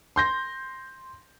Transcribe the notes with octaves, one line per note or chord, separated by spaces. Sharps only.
C6 G6 A#6